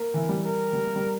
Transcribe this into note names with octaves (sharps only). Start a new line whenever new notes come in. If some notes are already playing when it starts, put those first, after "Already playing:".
Already playing: A#3 A#4
E3
G3
A#4
G3
A#3
G3